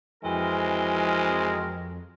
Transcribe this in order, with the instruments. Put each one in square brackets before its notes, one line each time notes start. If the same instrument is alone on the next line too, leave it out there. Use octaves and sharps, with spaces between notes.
[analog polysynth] F2 [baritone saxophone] E3 [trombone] G#3 [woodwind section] C4 F#4 A#4